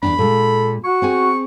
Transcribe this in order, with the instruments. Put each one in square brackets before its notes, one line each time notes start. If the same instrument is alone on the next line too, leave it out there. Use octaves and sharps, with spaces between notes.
[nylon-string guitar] E2 G2 D4 [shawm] B5
[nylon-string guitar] A#2 G#3 [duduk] A4
[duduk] F#4 [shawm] C#6
[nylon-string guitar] C4 G#4 G#5